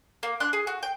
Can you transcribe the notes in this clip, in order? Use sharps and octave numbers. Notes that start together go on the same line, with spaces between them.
A#3
D4 C6 F#6
G#4
F#4
G5